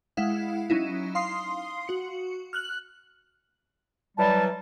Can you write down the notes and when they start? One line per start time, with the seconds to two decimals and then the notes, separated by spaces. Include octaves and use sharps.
0.17 G#3 E4 F5 F#5
0.70 F#3 C#4 D#4 E4
1.15 F5 C6 D#6 C7
1.88 F#4 C#7
2.53 F6 F#6 F#7
4.18 E3 F#3 G3 A5